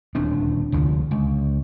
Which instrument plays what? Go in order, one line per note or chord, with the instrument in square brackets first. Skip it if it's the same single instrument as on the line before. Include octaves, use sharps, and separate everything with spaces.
[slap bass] D#1 D2 C4 D4
F1 D2 D3 F3
C#2